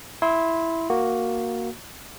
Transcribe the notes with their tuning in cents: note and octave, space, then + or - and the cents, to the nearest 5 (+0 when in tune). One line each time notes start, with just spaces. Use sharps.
E4 +0 C6 +0 E6 -35
A#3 +0 F#4 -5